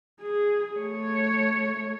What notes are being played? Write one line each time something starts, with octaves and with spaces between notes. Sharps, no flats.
G#4
A3 C#5